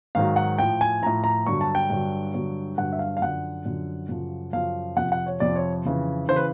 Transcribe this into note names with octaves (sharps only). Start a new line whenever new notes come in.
G#2 D#3 F#3 F5
F#5
A2 F3 G5
G#5
A2 F3 A#5
A#5
G2 D3 F#3 C#6
A5
G5
G2 D3 F#3
G2 D3 F#3
G2 D3 F#3 F#5
E5
F5
F5
F#2 D3 F3 F#5
F#2 D3 F3
F#2 C#3 F3
F#2 C#3 F3 F5
F2 C3 F3 F#5
F#5
C#5
F2 C3 F3 D5
C#5
F2 C#3 E3
C#3 E3 C5
B4